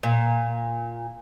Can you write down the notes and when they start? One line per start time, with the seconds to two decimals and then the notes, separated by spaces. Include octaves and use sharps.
0.03 A#2